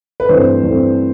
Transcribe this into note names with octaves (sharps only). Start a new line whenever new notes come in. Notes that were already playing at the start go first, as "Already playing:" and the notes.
B4
G2 E3 A3 C4 C5
G2 E3 A3 C4